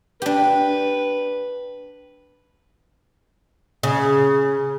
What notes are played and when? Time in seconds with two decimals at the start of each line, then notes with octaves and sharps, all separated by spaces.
0.22 D4 G4 B4
3.83 C#3